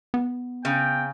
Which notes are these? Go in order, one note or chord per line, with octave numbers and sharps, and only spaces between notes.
B3
C#3 G5